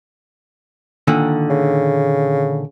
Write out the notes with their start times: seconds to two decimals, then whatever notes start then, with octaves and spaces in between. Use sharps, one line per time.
1.07 A#2 D3 D#3
1.50 C#3